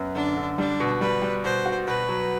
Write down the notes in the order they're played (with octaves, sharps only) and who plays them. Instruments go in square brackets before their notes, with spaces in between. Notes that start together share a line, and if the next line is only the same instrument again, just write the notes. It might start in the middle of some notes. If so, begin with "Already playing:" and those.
Already playing: [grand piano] F#2 B3
[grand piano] D3 [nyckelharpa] D4
[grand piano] D3
[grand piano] G3 [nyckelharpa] D4
[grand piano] B2
[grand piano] G3 [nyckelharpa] B4
[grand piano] G3
[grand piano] B2 [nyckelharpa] C5
[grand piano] F#4
[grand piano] B2 [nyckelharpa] B4
[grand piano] F#3